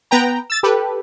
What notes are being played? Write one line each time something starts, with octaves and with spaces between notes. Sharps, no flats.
B3 B4 G5 A#5
E6 A6
G4 A4 B4